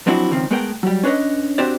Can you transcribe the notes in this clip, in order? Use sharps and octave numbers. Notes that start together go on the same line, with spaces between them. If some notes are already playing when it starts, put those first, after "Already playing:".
F3 F#3 C4 D4 E4 F#4
C#2 D#3 F3 C4
G#3 A3 B3 G#4 A#4 G5
F#3 G3
C#4 D4 B4 C#5 D#5
C4 D4 F#4 G4 C5 D5